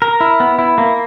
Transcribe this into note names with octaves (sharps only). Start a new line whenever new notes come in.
A#4
E4
B3
E4
A#3